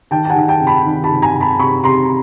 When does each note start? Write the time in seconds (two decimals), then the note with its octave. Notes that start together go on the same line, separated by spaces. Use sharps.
0.11 D#3 G5 A5
0.25 A5
0.30 F#5 G#5
0.36 D#3
0.48 G5 A5
0.60 C3
0.67 A5 B5
0.86 D#3
1.04 A5 B5
1.10 C3
1.22 G#5 A#5
1.34 C3
1.40 A5 B5
1.59 C3 B5 C#6
1.84 C3 A#5 C6